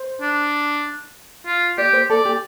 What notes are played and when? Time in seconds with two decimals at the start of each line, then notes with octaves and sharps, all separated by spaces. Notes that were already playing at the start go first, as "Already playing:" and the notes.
Already playing: C5
0.21 D4
1.46 F4
1.78 G4 D5
1.93 C5
2.10 A4 D5
2.25 G4